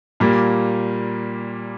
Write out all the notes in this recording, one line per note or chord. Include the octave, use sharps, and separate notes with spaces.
A#2 G3 A#3